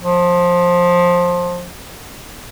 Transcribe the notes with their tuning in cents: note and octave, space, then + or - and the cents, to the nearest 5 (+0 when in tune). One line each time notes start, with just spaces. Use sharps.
F3 +15